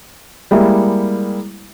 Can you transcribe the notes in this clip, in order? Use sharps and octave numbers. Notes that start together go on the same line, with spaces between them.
G3 G#3 A#3 E4